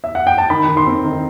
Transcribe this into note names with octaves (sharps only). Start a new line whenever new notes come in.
E5
F#5
G5
A5
D#3 B5
D#3
C6
C4
D#3